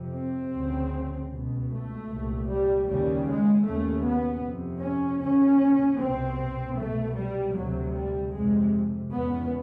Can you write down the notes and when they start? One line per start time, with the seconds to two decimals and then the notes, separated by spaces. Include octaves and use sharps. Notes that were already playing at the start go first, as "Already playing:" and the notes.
Already playing: F2 C3
0.14 C4
0.53 D2 C#3
1.31 C#2 B2
1.70 A3
2.09 C2 A#2
2.48 G3
2.87 D#2 C#3 G3
3.26 G#3
3.65 D#2 C#3 A3
4.03 B3
4.43 F2 C3
4.81 C#4
5.21 D#2 C#3 C#4
5.99 C2 B2 C4
6.77 C2 B2 A3
7.16 G3
7.55 D2 C3 F#3
7.94 G3
8.33 F2 C3 G#3
9.12 E2 C#3 B3